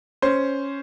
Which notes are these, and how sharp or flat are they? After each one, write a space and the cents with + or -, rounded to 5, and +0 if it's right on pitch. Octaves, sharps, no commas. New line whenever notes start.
C#4 +0 C5 -5